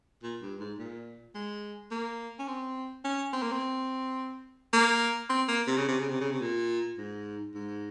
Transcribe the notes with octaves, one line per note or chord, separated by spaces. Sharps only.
A#2
G2
G#2
A#2
G#3
A#3
C#4
C4
C#4
C4
A#3
C4
A#3
C4
A#3
C3
C#3
C3
C#3
C3
C#3
C3
A#2
G#2
G#2